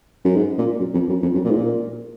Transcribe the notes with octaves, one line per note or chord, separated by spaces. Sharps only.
F#2
G#2
A#2
F#2
F2
F#2
F2
F#2
A#2
G#2
A#2